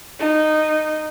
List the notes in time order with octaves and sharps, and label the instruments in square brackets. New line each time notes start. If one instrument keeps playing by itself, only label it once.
[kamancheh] D#4